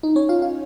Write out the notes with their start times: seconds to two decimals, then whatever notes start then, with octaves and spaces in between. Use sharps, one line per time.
0.03 D#4
0.16 C#4 C#5
0.29 F4 F5
0.42 F4 F5